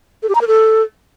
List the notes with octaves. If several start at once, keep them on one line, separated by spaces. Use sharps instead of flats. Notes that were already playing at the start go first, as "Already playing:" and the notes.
A4
G4
A#5
A#4
A4